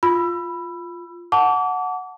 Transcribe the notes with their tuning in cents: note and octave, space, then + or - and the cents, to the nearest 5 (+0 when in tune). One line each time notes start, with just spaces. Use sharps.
F4 +0 B5 +0 E6 +30
F#5 -10 A5 +0 D6 -35